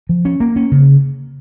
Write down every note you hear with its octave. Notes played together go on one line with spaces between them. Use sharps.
F3
C#4
A#3
C#4
C#3